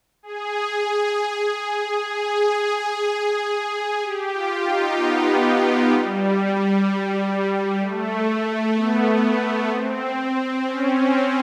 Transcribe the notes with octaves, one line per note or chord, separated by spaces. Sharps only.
G#4
G#4
G4
F4
D#4
B3
G3
A3
B3
C4
C#4
C4